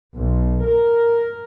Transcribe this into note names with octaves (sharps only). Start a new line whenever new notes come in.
B1
A#4